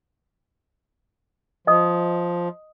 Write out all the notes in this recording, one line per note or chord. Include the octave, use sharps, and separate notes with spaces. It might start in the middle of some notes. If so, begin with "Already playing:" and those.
F3 D#5 D#6